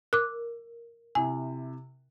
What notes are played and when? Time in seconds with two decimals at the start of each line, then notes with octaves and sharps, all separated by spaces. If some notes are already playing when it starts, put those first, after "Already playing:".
0.13 A#4 D6 F#6
1.15 C3 E4 G#5